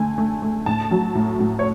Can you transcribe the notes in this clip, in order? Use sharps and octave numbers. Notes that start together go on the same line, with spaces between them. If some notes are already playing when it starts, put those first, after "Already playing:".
Already playing: D3 A3 G#5
A3
A3
A2 A5
F#3
A2
A2
C#5